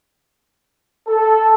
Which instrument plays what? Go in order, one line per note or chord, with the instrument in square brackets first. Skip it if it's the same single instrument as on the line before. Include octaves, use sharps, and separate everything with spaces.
[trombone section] A4